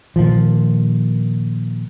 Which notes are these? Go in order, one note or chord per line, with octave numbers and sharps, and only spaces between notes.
A#2 D#3 F3